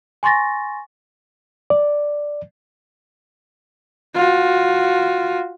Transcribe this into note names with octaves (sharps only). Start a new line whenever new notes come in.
G#5 C6 C#6 A6 A#6
D5
F4 F#4